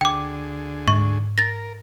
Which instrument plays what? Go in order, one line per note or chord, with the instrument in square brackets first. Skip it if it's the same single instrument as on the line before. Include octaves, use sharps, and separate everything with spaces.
[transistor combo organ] D2 D3 G#4 [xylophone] G5 D6
[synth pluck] G#2 [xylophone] C#6
[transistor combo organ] A#4 [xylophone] A6 A#6